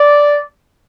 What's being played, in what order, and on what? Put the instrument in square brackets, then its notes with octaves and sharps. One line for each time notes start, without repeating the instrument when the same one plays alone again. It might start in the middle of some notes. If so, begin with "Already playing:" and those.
Already playing: [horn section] D5